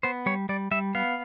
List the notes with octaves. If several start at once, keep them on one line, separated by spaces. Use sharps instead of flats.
B3 C5
G3 C#5
G3 D5
G3 E5
B3 F5